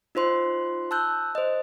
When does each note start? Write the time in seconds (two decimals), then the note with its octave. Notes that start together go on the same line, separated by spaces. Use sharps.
0.15 D#4 F4 C5 C6
0.91 A5 E6 F#6 G6
1.35 C5 D#5